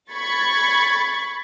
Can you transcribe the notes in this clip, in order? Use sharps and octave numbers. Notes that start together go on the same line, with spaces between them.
B5 C#6 G#6 A6